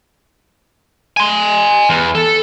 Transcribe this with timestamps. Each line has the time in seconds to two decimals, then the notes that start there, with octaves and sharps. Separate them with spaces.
1.17 G#5 C6
1.90 E2
2.15 A4